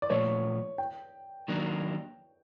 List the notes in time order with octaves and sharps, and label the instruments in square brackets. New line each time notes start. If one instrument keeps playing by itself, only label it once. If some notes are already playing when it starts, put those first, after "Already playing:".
[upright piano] D5
[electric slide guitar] A#2 F3 A3 [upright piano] C#5
[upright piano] G5
[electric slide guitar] D#3 F#3 A#3 D4